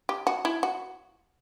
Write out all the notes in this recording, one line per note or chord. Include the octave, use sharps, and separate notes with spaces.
G4
F#4
E4
F#4